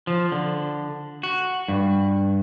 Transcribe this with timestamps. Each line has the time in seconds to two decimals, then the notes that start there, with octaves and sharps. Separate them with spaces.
0.07 F3
0.32 D3
1.23 F#4
1.68 G2